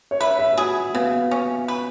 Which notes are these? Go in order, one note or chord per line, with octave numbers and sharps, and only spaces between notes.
C#5
B4 E5
E5
F#4 G#4
C#3 B3
C#4
B4